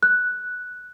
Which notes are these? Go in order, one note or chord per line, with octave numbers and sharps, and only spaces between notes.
F#6